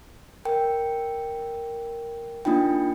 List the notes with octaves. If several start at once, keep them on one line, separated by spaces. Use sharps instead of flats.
A#4 G5
A#3 D4 D#4 F4 G5